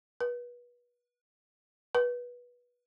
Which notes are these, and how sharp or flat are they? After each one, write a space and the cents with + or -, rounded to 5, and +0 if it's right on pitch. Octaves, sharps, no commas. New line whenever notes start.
B4 -30
B4 -20